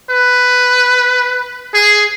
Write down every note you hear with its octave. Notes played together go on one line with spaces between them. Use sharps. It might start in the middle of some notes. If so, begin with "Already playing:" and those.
B4
G#4